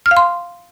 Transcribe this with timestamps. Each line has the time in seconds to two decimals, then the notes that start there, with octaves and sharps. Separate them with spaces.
0.06 F6
0.11 F5
0.17 C6